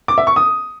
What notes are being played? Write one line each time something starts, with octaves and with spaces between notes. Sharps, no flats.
D6
E5
C#6
D#6